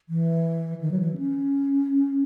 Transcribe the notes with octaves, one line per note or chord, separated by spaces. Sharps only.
E3
D#3
F#3
E3
C#4